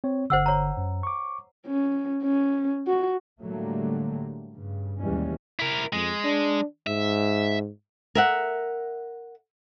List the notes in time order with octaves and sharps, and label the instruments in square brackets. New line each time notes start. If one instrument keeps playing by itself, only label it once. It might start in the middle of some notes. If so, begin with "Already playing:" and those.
[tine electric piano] C4 C#5
[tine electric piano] G1 D3 [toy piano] C5 F#5 E6
[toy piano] C#5 A#5
[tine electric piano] F#2
C#6 D6
[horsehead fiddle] C#4
C#4
F#4
[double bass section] A2 D3 F#3 G3 A3 A#3
G2 C#3
D#2 B2 E3 G3 G#3 C#4
[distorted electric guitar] E4 A#4
[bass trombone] F2 [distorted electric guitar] G#3
[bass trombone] D4
[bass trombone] G#2 [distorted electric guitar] E5
[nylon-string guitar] A#4 E5 F#5